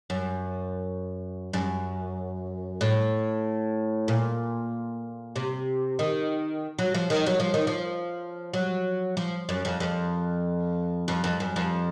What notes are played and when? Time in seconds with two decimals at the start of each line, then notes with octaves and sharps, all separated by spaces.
0.10 F#2
1.53 F#2
2.81 A2
4.08 A#2
5.36 C3
5.99 D#3
6.79 F#3
6.94 F3
7.10 D#3
7.26 F#3
7.40 F3
7.54 D#3
7.67 F3
8.54 F#3
9.17 F3
9.49 F#2
9.65 F2
9.80 F2
11.08 F2
11.24 F2
11.40 F#2
11.56 F2